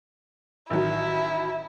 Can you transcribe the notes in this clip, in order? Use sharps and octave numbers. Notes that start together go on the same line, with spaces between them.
A1 D#3 F#3 E4